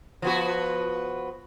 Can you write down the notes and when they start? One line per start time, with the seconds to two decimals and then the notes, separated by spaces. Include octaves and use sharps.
0.22 F3 B3 F#4